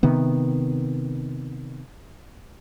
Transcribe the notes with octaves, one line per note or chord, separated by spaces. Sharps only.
C3 D#3 B3